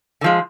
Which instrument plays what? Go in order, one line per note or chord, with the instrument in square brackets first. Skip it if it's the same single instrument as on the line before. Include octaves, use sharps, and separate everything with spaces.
[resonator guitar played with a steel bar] D3
F3 G#3